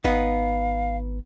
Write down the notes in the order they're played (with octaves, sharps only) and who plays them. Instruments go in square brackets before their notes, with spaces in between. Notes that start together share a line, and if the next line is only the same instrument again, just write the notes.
[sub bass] G#1 [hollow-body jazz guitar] B3 D#4 [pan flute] F5